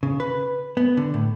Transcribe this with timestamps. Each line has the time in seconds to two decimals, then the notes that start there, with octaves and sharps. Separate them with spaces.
0.03 C#3
0.20 B4
0.77 B3
0.97 D3
1.14 A2